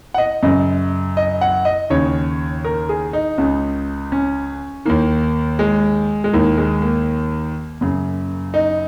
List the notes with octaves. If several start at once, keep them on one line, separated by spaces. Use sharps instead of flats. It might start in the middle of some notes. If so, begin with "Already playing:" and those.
F#5
D#5
F#2 C#3 D#5
D#5
F#5
D#5
D#2 C#3 C#5
A#4
G#4
D#4
C#2 C#3
C#4
D#2 D#3 A#3
G#3
G#3
D#2 D#3 A#3
G#3
A#3
F#2 C#3
D#4